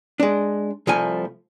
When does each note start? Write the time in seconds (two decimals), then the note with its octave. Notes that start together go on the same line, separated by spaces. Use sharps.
0.20 G#3 D4
0.87 C2 F3 A3 G#5